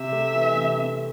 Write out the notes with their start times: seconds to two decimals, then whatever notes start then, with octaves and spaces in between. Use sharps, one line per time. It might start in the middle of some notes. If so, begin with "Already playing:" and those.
Already playing: C3 E5
0.12 A3
0.35 E3
0.57 C3
0.77 C3